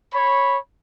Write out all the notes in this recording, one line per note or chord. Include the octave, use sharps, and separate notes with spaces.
C#5 B5